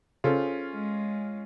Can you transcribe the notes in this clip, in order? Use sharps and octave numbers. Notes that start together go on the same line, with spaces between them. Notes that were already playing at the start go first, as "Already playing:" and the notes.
C#3 C#4 F4 G#4 A4 C5
G#3